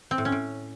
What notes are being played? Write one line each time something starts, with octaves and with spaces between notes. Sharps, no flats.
C4
A2
C#4
A2